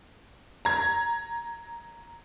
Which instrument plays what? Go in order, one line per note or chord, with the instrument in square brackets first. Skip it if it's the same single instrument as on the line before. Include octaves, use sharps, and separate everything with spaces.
[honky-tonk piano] A#5 G#6